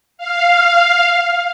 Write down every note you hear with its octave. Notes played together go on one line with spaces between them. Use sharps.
F5